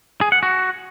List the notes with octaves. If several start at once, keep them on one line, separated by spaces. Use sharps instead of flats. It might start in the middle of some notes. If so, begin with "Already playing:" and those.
G#4
F#5
F#4